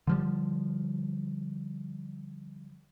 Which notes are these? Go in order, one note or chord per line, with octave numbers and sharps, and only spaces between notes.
D3 F3 G3